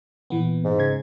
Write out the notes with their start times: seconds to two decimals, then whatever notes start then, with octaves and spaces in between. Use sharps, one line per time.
0.30 A#2 E3 B3
0.64 G#2
0.79 C#3 G#6